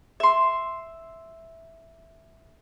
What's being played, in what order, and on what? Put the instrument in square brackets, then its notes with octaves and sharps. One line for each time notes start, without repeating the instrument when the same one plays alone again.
[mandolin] E5 C6